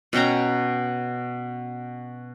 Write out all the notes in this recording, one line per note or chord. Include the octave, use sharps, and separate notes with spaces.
B2 C#4 G5 A#5